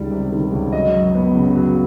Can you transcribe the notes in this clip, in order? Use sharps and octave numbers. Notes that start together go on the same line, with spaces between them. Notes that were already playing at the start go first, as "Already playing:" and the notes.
Already playing: C#2 D#3 G3 D5
C3
D#3
C#2
F#3 D#5
F#2
B3
C#3
F#3